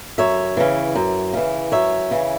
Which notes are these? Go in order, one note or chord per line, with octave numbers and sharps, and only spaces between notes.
F#2 C#5 E5
C#3 E3
F#2
C#3 E3
F#2 C#5 E5
C#3 E3